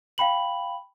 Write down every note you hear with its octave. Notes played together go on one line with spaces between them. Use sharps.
F5 G5 B5 F#7